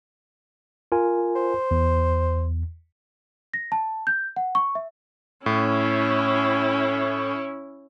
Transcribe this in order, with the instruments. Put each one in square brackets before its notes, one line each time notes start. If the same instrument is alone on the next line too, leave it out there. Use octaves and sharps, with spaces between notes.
[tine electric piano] F4 A#4 G#5
[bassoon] C5
[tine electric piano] E2
[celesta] A#6
A5
G6
F#5
C#6
E5
[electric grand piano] A2 [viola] C#4 E4